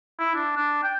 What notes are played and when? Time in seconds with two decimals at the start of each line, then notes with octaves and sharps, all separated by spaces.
0.19 E4
0.35 D4
0.56 D4
0.83 G5